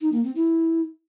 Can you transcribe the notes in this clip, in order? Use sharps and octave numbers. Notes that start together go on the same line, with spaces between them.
D#4
A#3
C4
E4